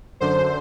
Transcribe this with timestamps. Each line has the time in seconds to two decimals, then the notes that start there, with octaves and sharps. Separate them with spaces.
0.20 F#2 D3 C5